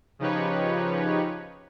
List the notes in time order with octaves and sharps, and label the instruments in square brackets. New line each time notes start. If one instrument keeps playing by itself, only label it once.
[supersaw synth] C#3 F3 D#4 G4 B4 C#5